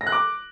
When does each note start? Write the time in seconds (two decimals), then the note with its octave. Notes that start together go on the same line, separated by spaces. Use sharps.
0.01 A#6
0.07 F#6
0.12 D6